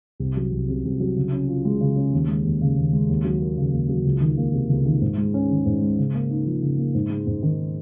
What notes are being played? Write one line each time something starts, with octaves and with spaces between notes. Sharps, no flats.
C2
F#3
C2
C3
C2
F#3
C#3
C#4
F4
G#3
C#3
C#4
D#2
G#3
D#2
C#3
D#2
G#3
D#2
F#3
A#3
C#3
D#2
F#3
C#2
D#3
A#3
C3
C#2
D#3
G#2
G#3
C#4
D#3
G#2
G#3
C#3
A#3
D#4
F3
C#3
A#3
G#2
G#3
G#2
D#3